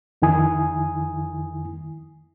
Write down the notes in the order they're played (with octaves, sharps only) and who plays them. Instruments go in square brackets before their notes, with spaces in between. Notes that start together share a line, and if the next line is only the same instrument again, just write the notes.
[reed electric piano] F2 D#3 E4 G#5 D#6